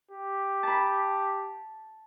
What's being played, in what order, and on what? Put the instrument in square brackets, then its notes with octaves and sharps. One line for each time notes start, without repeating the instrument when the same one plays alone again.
[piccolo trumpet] G4
[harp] A5 B5